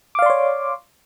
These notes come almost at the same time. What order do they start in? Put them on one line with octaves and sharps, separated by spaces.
D6 F5 D5 C6 C#5